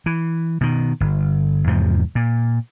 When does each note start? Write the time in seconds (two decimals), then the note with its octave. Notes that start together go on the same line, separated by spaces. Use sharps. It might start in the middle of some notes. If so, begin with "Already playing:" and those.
0.06 E3
0.61 B2 D#3
1.00 G1
1.67 E2 G#2 C3 F3
2.15 A#2